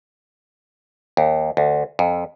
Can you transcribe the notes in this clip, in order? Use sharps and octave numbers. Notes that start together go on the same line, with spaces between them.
D#2
D2
F2